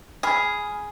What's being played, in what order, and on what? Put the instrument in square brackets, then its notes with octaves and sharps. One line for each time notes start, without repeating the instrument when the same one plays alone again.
[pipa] G#4 [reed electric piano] G#5 B5 F6